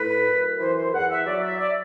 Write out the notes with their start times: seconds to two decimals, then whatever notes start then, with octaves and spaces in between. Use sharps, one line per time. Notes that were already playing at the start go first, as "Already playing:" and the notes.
Already playing: A2 B4
0.26 F#2
0.59 E3 C5
0.77 C5
0.93 E2 F#5
1.11 E5
1.26 F#3 D5
1.44 E5
1.60 D5